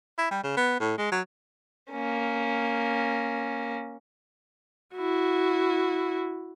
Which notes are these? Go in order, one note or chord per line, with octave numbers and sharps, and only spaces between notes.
E4
G3
C#3
B3
A2
G#3
F#3
A#3 C#4
E4 F#4